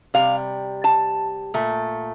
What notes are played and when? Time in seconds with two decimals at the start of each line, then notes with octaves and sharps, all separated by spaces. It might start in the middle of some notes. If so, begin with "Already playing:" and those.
0.14 C3 G3 F5
0.84 A5
1.54 A#2 A3